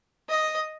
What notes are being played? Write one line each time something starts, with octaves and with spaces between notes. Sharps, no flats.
D#5